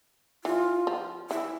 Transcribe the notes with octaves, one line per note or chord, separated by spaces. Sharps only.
E3 F4
F3
E3 E4